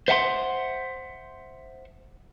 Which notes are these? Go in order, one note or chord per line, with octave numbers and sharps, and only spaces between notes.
C5 E5 F#5 A5 C6